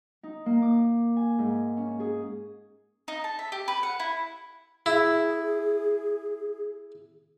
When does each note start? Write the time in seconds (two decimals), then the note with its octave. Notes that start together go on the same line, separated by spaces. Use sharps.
0.23 D#4
0.46 A#3
0.62 D6
1.17 G#5
1.38 G#2
1.77 C#4
2.00 G#4
3.08 D#4
3.24 A5
3.39 E5
3.52 G4
3.68 B4
3.83 F#5
4.00 E4
4.86 E4 G#4